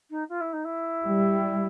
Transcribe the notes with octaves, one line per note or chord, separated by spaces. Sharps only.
D#4
F4
E4
D#4
E4
G3